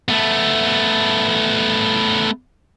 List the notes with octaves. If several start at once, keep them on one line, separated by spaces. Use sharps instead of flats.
A3 B3